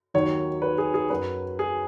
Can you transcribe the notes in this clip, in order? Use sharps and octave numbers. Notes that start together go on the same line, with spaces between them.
D#2 D#3 F#3 C#5
B4
G#4
G#4
F#2 F#3 B4
G#4